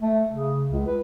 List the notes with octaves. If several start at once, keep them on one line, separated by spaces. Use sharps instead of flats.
A3
C#3
C#2
B4